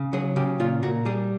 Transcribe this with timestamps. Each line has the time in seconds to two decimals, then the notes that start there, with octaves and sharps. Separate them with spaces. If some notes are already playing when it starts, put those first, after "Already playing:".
Already playing: C#3
0.13 F#3 G#4
0.36 C#3 G4
0.60 A#2 F4
0.83 A#2 F#4
1.05 G3 G#4